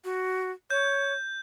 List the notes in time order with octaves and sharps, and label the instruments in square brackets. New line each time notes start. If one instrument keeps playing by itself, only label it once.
[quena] F#4
[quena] C#5 [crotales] G6